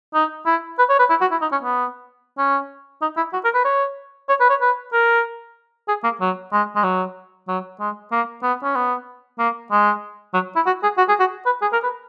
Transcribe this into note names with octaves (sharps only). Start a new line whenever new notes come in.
D#4
E4
B4
C#5
B4
E4
F#4
E4
D#4
C#4
B3
C#4
D#4
E4
F#4
A#4
B4
C#5
C#5
B4
C#5
B4
A#4
G#4
A#3
F#3
G#3
G#3
F#3
F#3
G#3
A#3
B3
C#4
B3
A#3
G#3
F#3
E4
F#4
G#4
F#4
G#4
F#4
B4
G#4
A#4
B4